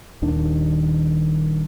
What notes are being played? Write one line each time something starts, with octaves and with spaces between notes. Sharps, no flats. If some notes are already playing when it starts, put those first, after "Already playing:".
D#1 D#2 D#3 D4